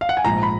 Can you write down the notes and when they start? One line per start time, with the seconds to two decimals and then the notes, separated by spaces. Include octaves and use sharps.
0.01 F5
0.09 F#5
0.17 G#5
0.25 A#1 G#2 F3 A#5
0.43 B5